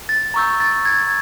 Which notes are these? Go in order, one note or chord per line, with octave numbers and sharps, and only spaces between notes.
A6
A#5 C#6 E6 G6
A6
G#6